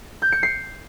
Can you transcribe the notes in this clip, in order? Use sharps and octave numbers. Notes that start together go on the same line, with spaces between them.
G6
C#7
C7